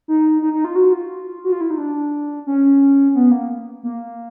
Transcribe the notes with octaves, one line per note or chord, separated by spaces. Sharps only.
D#4
D#4
D#4
F4
F#4
F4
F#4
F4
E4
D#4
D4
C#4
B3
A#3
A#3